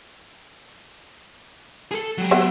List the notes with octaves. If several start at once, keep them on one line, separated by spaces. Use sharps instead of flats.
G#4 A4
F#3 G4
B3 F#4 E5